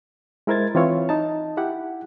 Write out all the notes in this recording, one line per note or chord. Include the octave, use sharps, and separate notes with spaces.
G#3 E4 A#4 C5 G#6 A6
E3 C4 E4 F4 C#5
D#4 A5
E4 G4 F#5